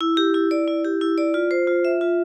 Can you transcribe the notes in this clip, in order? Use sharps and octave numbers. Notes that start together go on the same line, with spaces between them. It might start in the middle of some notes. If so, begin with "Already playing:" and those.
E4
G4
E4
D5
E4
G4
E4
D5
F4
C5
F4
E5
F4